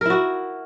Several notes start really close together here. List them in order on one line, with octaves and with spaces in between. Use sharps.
A#4 E4 F#4